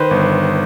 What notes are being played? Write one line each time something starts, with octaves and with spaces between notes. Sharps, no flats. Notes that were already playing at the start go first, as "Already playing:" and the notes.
Already playing: D#3 B4 C5
G1